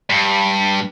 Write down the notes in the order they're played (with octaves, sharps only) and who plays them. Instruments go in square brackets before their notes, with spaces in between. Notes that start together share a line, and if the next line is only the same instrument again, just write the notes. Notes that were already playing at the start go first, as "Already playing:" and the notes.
[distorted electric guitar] G2